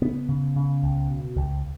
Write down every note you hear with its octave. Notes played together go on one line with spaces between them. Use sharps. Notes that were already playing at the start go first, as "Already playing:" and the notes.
C#3 B3
C#3
C#3
C#2
B2
C#2